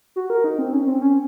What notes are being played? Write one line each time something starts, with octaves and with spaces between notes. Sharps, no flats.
F#4
A#4
D#4
C4
C#4
C#4
C4
C#4